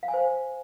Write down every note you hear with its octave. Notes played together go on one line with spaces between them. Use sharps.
F5
G#5
C5